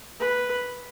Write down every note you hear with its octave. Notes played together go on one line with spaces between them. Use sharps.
B4